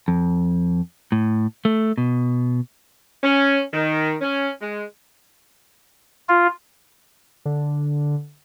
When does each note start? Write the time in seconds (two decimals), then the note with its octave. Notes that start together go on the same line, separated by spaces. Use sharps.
0.08 F2
1.12 A2
1.65 A3
1.98 B2
3.24 C#4
3.74 D#3
4.22 C#4
4.62 G#3
6.29 F4
7.45 D3